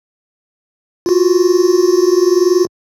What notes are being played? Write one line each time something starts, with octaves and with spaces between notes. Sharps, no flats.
F4 F#4